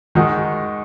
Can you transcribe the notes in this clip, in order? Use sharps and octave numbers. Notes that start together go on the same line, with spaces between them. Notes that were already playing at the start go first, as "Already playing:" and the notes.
D#3 G#3 D#4 F#4